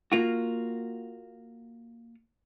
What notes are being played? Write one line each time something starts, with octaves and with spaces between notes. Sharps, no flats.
A#3 F4 F#4